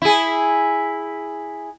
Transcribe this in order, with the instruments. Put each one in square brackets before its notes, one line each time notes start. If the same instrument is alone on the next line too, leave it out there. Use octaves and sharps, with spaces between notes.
[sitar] E4 G#4